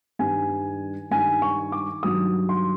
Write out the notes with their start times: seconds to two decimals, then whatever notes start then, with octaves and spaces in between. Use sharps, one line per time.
0.19 G2 D#3 G3 G#5
1.11 G2 D#3 G3 G#5
1.42 C#6
1.72 D6
2.03 G2 D#3 F#3 D#6
2.49 C6